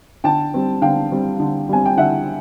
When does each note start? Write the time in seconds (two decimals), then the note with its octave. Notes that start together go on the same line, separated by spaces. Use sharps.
0.24 D3 G5 A5
0.54 G3 C4
0.82 D3 F5 G5
1.12 G3 C4
1.40 D3
1.69 G3 C4 G#5
1.86 G5
1.97 D3 E5 F#5